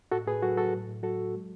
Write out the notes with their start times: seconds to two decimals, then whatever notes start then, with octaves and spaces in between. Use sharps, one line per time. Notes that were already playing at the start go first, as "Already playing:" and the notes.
0.11 A2 F#4 A4
0.27 A2 G#4 B4
0.42 F#3 F#4 A4
0.57 F#3 F#4 A4
0.73 A2
0.88 A2
1.03 F#3 F#4 A4
1.19 F#3
1.34 G#3